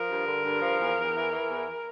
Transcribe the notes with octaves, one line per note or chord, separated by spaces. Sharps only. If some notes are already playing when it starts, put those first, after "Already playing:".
Already playing: F3 A#4
G2
D3
G2
F3
E2
E2
E3
E3
E2